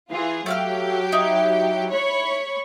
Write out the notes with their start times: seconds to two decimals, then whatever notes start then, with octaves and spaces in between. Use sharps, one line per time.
0.10 E3 F4 G#4
0.46 F#3 A3 G4 F5 G5 F6
1.12 D#4 E4
1.89 C#5 B5 C#6